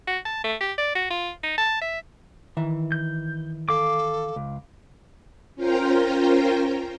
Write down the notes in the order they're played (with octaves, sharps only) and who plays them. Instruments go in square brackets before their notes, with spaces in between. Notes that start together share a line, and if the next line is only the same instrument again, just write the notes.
[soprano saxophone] F#4
A5
A3
G4
D5
F#4
F4
D#4
A5
E5
[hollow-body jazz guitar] D#3 E3 E5
[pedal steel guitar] G6
[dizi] A4 [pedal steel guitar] F5 D6
[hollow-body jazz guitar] C#2
[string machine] C#4 F4 A#4 C5 G5 A#5